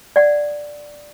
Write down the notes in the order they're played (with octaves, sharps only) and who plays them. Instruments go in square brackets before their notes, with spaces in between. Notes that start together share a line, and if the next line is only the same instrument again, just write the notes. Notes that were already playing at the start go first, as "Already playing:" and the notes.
[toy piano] D5 F#5